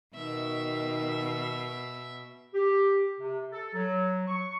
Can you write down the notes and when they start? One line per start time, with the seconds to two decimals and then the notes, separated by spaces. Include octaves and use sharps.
0.15 B2 D#3 E5
2.54 G4
3.19 C3
3.53 A4
3.74 F#3
4.27 C#6